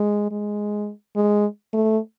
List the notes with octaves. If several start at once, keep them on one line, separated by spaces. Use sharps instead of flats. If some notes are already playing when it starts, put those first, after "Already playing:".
Already playing: G#3
G#3
G#3
A3